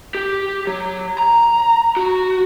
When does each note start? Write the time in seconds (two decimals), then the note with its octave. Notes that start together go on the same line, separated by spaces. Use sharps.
0.15 G4
0.67 F#3
1.19 A#5
1.97 F#4